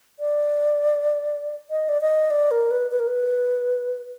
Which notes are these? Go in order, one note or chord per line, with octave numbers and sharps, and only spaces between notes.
D5
D#5
D5
D#5
D5
A#4
B4
B4
A#4
B4